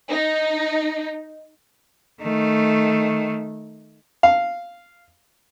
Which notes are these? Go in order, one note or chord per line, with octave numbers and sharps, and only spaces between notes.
D#4
D#3 A3
F5